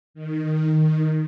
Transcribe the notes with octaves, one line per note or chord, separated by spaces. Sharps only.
D#3
D#3
D#3